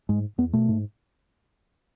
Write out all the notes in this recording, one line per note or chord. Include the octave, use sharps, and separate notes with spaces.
G#2 G#3
E2 B3
B2 A3
G#2